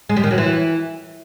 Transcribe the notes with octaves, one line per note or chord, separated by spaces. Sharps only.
G#3
G3
D#3
F#3
E3